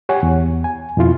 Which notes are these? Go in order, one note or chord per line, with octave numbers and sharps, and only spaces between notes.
G4 C#5 F#5 G#5
E2
G#5
F2 B2 E4 F4